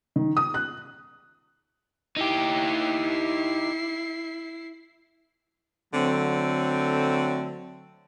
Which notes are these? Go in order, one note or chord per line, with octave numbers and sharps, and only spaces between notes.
D#3
D#6
F#6
D#4 E4 G4 C7
D3 F#3 A3 C4